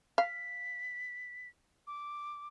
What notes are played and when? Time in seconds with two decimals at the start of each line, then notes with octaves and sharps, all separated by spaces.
0.18 F5 B6
1.87 D6